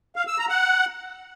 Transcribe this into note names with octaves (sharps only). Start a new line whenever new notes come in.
F5
E6
A#5
F#5